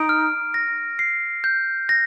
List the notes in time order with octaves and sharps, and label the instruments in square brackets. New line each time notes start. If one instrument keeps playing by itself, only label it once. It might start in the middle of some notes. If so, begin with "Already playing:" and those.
Already playing: [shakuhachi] D#4 [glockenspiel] D7
[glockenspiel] F6
A#6
C7
G6
A#6